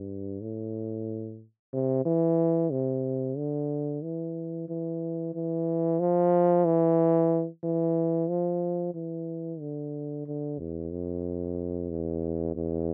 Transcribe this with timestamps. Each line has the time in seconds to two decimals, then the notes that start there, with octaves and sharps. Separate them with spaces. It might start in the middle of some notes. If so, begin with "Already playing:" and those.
Already playing: G2
0.41 A2
1.73 C3
2.05 E3
2.71 C3
3.37 D3
4.03 E3
4.68 E3
5.34 E3
6.00 F3
6.65 E3
7.64 E3
8.29 F3
8.95 E3
9.60 D3
10.26 D3
10.59 E2
10.92 F2
11.90 E2
12.55 E2